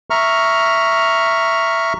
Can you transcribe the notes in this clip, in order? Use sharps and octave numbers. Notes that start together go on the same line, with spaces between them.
E5 A#5 C#6 F6